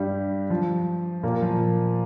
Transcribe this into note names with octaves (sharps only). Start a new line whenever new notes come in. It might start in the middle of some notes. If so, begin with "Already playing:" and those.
Already playing: G2 G3
F3
A#2 A#3
F3